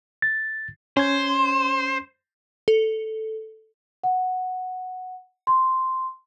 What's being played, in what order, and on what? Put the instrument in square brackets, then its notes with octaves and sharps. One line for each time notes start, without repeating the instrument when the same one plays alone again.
[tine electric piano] A6
[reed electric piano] C#4 G#6 [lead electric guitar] C5
[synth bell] A4
[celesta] F#5
C6